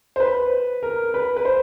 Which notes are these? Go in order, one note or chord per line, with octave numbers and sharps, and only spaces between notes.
C5
B4
A#4
B4
B4
C5